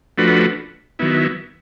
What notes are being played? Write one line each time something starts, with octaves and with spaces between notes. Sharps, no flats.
F3 A3 D4 F#4 B4
D#3 F#3 B3 E4